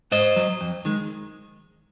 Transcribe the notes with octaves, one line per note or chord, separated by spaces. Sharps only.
G#2 C5 D#5
F#3
F2
D#3 G#3